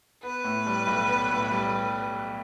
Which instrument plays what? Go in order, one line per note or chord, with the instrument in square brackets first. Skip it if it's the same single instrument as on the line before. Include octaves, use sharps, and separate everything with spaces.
[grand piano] B3 [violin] B4
[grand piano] A2
G3
B1
B3
A2
G3